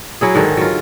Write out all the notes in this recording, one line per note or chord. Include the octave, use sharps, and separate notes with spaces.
F#3 E4 G#4
G#2 D3 D#3
F#3 F4